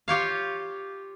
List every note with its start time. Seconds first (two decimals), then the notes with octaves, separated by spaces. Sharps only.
0.08 F4 G4 C#5 F5